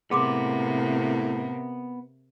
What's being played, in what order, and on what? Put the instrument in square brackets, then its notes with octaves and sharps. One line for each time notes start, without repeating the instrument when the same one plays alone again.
[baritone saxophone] A2 [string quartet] C3 A#3 [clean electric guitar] B3 [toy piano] G#4 C6 D6